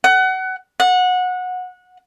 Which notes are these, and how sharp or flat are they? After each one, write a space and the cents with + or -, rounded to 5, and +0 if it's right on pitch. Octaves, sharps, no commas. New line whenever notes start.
F#5 +25
F#5 -20